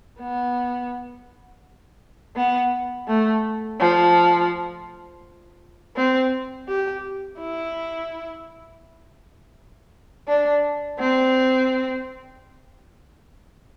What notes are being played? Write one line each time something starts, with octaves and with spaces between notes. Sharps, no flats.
B3
B3
A3
F3
C4
G4
E4
D4
C4